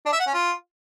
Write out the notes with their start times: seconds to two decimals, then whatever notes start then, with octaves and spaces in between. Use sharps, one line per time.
0.05 D4
0.12 E5
0.19 F#5
0.26 C#4
0.34 F4